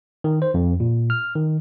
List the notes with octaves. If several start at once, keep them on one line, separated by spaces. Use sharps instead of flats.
D#3
C5
F2
A#2
F6
D#3